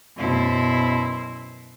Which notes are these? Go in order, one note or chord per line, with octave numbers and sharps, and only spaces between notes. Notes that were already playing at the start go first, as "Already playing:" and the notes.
F#2 B2 E4 C5